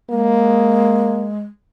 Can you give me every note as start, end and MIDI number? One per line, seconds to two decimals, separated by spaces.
0.10 1.41 56
0.10 1.30 58